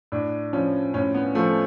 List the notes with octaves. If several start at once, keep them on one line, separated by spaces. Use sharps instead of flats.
A2 D4
F3 C#4
A2 C#4
B3
F3 A3